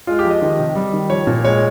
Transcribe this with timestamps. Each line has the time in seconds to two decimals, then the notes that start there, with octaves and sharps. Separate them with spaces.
0.07 G#3 F4
0.19 G4
0.25 F3
0.30 D#5
0.42 D#3
0.59 C3
0.76 G3
0.93 D#3
1.09 F3 C#5
1.27 A#2
1.44 G#3 C#5